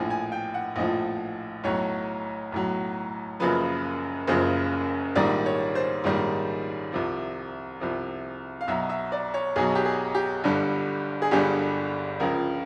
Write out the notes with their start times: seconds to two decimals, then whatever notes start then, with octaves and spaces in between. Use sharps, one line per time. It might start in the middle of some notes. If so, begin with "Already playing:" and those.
Already playing: A#1 A2 F3 G#5
0.10 G#5
0.32 G5
0.54 F#5
0.76 A#1 A2 F3 D#5
1.64 B1 A2 F#3 C#5
2.52 B1 A2 F#3
3.40 F#1 F#2 C#3 F3 B4
4.28 F#1 F#2 C#3 F3 C5
5.16 A#1 G#2 D#3 G3 D5
5.46 C#5
5.75 C5
6.04 A#1 G#2 D#3 G3
6.92 C2 C3 F3
7.80 C2 C3 F3
8.61 F5
8.68 B1 B2 F#3 E5
8.90 E5
9.12 D5
9.34 C#5
9.56 B1 B2 F#3 G#4
9.75 G4
9.85 G#4
10.15 G4
10.44 G1 G2 D3 G3
11.22 G#4
11.31 G1 G2 D3 G3 G4
12.20 C#2 C#3 F3 A#4